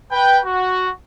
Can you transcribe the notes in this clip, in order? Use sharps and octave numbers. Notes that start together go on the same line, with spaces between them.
B4 G5
F#4